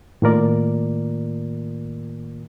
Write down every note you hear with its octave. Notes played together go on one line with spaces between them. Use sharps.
A2 D#3 A#3 F4 A#4 D5